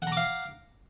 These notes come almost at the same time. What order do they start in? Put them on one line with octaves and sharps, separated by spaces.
F#5 A#5 D6 F5